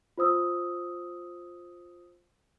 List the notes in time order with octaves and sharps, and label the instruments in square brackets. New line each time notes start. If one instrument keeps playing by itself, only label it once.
[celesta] F4 C5 D#6 E6